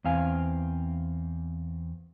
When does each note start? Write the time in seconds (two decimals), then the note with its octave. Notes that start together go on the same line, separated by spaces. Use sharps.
0.04 E2 C4 F5 G#5